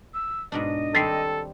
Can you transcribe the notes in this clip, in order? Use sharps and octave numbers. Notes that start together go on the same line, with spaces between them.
E6
G#2 B2 D4 D#5
D#3 G3 C4 A4 A6 B6 C7